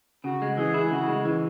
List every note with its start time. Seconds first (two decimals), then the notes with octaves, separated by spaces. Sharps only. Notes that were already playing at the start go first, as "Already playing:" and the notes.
0.24 C#3 F#4
0.42 G#3
0.57 E3 G#4
0.74 E4
0.91 C#3 F#4
1.08 G#3
1.25 E3